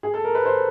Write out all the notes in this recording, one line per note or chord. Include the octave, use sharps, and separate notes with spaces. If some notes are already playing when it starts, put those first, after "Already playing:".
G#4
A4
A#4
B4
C5